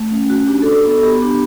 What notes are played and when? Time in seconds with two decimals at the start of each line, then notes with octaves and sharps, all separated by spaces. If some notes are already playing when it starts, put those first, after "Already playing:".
Already playing: A3
0.11 C#4
0.30 F#4
0.48 D4 G4
0.62 F#4 A4
0.85 B3 A4
1.03 B3 G4
1.22 D4